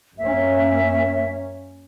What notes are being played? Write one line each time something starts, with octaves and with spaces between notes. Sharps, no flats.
F#2 A#3 C#4 E5